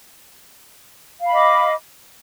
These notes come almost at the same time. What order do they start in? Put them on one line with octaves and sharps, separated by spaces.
F5 B5 D#5 D6